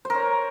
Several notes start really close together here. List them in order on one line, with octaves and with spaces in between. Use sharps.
C5 A#4 C#5